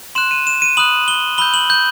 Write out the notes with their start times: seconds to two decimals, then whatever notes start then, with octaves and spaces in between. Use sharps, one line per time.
0.15 C6 F#6 E7
0.31 D#7
0.47 E7
0.62 D#7
0.77 B5 D#6 F#6 F#7
1.08 G7
1.38 B5 E6 G6 G7
1.54 F#7
1.70 G6